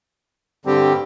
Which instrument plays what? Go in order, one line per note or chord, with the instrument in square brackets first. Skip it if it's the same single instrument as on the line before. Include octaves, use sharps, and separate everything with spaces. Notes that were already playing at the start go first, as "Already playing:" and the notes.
[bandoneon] G2 D3 G3 C4 G4